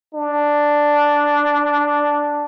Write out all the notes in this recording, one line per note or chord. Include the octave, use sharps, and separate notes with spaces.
D4